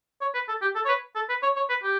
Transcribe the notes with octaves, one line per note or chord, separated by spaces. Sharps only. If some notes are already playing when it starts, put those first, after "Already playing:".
C#5
B4
A4
G4
A4
C#5
B4
A4
B4
C#5
C#5
B4
G4